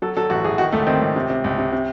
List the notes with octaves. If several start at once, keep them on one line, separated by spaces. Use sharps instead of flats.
F#3 A4
F#3 A4
A1 F#4
A1 G#4
D#3 F#4
C#2 A3
D#3 C4
C#2
C3
C3
C#2
C3
C3